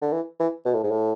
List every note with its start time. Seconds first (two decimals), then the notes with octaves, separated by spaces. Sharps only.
0.02 D3
0.12 E3
0.40 E3
0.65 B2
0.74 A2
0.83 G#2
0.91 A2